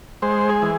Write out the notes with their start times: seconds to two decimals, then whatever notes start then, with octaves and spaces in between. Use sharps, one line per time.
0.22 G#3 C5
0.49 G#4
0.62 E3